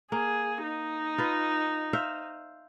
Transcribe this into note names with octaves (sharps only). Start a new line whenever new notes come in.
A#3 G#4
D#4
F4 B4
C5 E5 F5